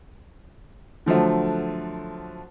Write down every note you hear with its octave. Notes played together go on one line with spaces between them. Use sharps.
D3 F3 F#3 A3